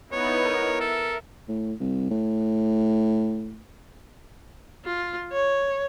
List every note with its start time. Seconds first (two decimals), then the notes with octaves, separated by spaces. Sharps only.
0.12 B3 D#4 E4 C#5
0.46 A#4
0.81 A4 E5
1.48 A2
1.80 C2
2.10 A2
4.85 F4
5.32 C#5